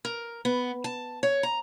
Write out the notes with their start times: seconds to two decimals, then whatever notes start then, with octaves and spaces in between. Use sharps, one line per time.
0.05 A#4
0.45 B3
0.84 A5
1.23 C#5
1.43 A#5